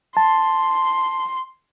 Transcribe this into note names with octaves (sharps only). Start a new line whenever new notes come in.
A5 C6